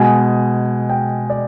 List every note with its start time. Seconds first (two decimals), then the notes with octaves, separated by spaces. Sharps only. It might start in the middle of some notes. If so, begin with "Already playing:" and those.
Already playing: B2 G#3 G#5
0.90 G5
1.30 D5